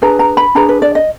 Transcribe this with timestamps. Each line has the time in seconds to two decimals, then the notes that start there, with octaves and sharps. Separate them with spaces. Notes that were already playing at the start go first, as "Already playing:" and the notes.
0.02 D4 G#4 B4 A#5
0.19 A#5
0.37 B5
0.55 D4 G#4 B4 A#5
0.69 B4
0.82 D5
0.95 D#5